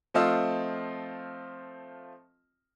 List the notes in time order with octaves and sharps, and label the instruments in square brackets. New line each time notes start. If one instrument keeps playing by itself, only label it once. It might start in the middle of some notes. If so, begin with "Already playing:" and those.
[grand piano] F3 A3 C4 F4 D#5 E6